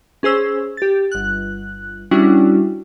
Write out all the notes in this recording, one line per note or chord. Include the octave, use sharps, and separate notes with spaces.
C#4 G#4 C5 E6
G4 A6
G1 F#6
G3 C#4 D4 E4 F#4